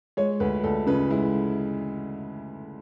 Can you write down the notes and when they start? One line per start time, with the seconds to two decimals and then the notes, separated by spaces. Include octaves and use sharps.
0.17 G#3 C#5
0.40 D2 B4
0.64 D2 A4
0.87 C#3 B4
1.10 G#3 E4